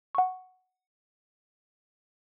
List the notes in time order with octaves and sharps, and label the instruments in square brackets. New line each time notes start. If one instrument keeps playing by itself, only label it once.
[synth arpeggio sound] F#5 C#6